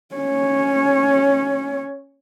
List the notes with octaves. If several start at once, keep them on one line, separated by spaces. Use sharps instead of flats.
C#4 C#5